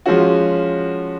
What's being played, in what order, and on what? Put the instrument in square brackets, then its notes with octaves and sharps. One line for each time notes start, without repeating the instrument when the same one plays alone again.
[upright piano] F3 G#3 C#4 F#4